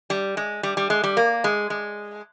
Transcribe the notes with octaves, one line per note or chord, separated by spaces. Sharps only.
G3
G#3
G3
G3
G#3
G3
A#3
G#3
G#3